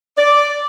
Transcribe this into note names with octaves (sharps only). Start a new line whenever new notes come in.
D5